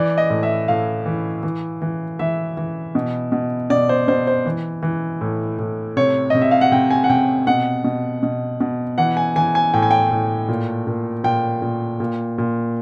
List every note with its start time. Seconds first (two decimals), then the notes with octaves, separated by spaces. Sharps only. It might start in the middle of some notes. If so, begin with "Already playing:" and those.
Already playing: E3 D5
0.18 D#5
0.30 A2
0.43 E5
0.68 A2 F5
1.06 E3
1.43 E3
1.82 E3
2.19 E3 E5
2.57 E3
2.95 B2
3.32 B2
3.70 B2 D5
3.89 C5
4.08 B2 C5
4.27 C5
4.46 E3
4.83 E3
5.21 A2
5.59 A2
5.97 C3 C#5
6.30 C3 D#5
6.42 E5
6.51 F5
6.61 F#5
6.72 C3 G5
6.90 G#5
7.04 F#5
7.10 C3 G5
7.47 B2 F#5
7.84 B2
8.23 B2
8.60 B2
8.98 E3 F#5
9.17 G#5
9.36 E3 G#5
9.55 G#5
9.74 A2 G5
9.82 G#5
9.91 G5
10.11 A2
10.48 A#2
10.87 A#2
11.24 A#2 G5
11.62 A#2
12.00 A#2
12.38 A#2